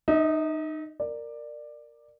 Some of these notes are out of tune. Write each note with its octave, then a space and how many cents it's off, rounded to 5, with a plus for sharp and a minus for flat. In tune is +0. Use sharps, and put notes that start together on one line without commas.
D#4 -20 D#5 +45
A#4 -10 D5 +15